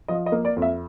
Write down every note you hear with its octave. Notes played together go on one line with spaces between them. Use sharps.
F3 D#5
D#5
A#3
D5
F2
E5